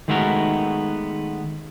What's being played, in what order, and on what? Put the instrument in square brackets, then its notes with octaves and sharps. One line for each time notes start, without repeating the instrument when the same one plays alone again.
[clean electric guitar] D#3 G#3 A3 B3 F#4 A#4